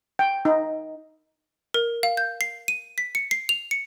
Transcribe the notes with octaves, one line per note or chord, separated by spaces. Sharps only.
G5
D#4
A#4
F5
G6
C7
D#7
B6
C#7
C7
F7
C#7